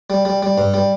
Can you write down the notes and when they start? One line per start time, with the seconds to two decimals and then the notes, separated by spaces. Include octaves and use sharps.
0.10 G3
0.25 G3
0.43 G3
0.58 G2
0.74 G3